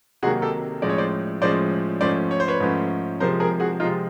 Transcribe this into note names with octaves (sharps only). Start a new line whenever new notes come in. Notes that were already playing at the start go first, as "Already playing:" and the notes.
C3 D#3 F#3 A#3 F#4 G#4
G4 A4
A2 F3 G#3 C#4 D5
C#5
C5 D5
A2 F3 G#3 C#4 C5 D5
G#2 F3 A3 C#4 C5 D5
C#5
C5
B4 C#5
G#2 F3 A3 C#4
C3 F3 G#3 A#4 C5
G#4 A#4
F#4 G#4
C3 F3 G#3 D#4 F4